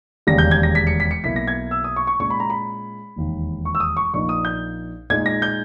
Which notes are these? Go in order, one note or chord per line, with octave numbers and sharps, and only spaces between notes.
E1 D#2 C#3 G3 A#6
G6
G#6
A#6
B6
C#7
B6
C#7
B1 B2 A#3 E4 B6
A#6
G#6
E6
D#6
C#6
C#6
A#2 G#3 C#4 C#6
B5
A#5
B5
E1 D#2 D#3
C#6
E6
D#6
C#6
A#1 A#2 A#3 D#4 C#6
D#6
G6
A#2 G#3 D#4 G#6
A#6
G6